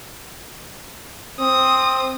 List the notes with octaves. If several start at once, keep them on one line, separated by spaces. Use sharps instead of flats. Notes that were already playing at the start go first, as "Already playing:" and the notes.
C4 D#6